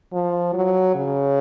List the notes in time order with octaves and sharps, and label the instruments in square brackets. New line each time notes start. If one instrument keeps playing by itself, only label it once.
[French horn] F3
F#3
C#3